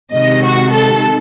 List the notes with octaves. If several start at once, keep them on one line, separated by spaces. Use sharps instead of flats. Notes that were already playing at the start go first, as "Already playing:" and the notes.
C3 D#3 G#3 D#5
F#4
A4